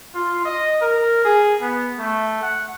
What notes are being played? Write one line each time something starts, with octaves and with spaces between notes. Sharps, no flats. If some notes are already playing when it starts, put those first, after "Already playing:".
F4
D#5
A#4
G#4
B3
A3
F#5